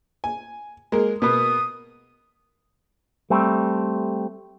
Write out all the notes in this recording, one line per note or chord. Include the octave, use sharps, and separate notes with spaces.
G#5
G#3 A#3 A#4
B2 A#3 B3 D#6
G3 A3 C4